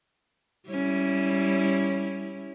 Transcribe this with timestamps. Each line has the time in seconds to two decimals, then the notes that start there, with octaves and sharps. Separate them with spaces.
0.69 G3 C#4 E4